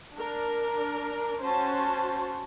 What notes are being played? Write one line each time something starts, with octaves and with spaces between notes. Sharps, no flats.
D4 A#4
C#4 F#4 C5 A5